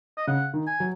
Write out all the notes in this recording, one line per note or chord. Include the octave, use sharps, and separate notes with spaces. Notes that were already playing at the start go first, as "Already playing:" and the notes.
D#5
C#3 F#5
D#3
G#5
F#3